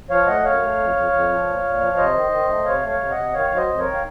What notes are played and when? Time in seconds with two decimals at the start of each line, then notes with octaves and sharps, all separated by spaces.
0.10 F3 C#5 F5
0.27 A3 D#5 F#5
0.44 F#2 C#5 F5
0.62 A3
0.78 F2
0.96 F2
1.12 F2
1.29 F3
1.46 A#2
1.64 A#2
1.81 F3
1.97 C3 C5 D#5
2.14 D#3
2.31 D#3
2.49 A3
2.65 C3 C#5 F5
2.82 A3
2.88 C#5 F5
2.99 C3
3.11 D#5 F#5
3.17 C3
3.33 D#3 C#5 F5
3.51 F#3
3.56 C5 D#5
3.68 F2
3.79 A#4 C#5
3.85 D#3
3.94 F5